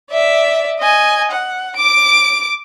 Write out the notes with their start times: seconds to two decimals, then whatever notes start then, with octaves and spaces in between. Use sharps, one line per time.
0.11 D5 E5
0.80 D#5 G#5
1.31 F#5
1.76 D6 D7